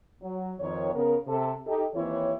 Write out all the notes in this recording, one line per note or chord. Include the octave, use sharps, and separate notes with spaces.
F#3
F2 D#3 C#5
C#3 B3 A#4
C3 A4
D#4 G4 A4
D#2 E3 C4 E4 C#5